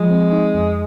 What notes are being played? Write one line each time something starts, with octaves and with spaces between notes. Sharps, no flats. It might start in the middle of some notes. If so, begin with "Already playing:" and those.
Already playing: F3 G#3
C4
D#4
F2